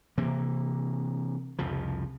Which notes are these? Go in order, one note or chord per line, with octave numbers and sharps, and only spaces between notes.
C3 E3 A#3
C2 F2 C#3 F3